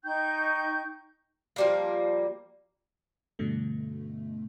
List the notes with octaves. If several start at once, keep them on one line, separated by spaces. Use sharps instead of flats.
D#4 G5 C#6 G6
F3 G3 A#3
G2 B2 D3 A3